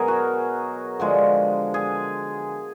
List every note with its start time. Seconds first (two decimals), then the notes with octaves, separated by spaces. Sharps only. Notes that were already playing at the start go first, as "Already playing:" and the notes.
Already playing: B2 F#3 G#4 A#4
0.08 F#4
1.00 D3 F3 G#3
1.74 G#4